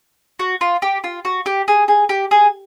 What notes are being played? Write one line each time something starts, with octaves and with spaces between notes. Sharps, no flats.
F#4
F4
G4
F4
F#4
G4
G#4
G#4
G4
G#4